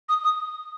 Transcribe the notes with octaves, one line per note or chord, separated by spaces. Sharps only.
D#6
D#6